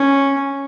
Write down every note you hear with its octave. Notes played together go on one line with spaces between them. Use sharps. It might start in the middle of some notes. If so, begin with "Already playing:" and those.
Already playing: C#4